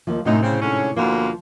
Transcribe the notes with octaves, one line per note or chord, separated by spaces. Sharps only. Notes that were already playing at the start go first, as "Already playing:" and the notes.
D#2 F3
F#2 A2 C3 D#4
C#3 C4
G#2 D3 C#4
D2 B2 F3 A#3